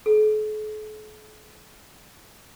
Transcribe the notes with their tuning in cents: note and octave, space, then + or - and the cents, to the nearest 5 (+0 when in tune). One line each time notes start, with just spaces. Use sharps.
A4 -45